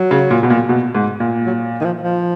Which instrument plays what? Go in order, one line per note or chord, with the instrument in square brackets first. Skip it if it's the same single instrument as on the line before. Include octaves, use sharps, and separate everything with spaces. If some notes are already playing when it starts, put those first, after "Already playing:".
Already playing: [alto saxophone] F#3
[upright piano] C#3
A#2
B2
A#2
B2
G#2
A#2
[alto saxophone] F#3
D#3
F3
F3